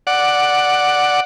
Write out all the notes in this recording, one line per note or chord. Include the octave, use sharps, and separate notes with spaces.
D5 F#5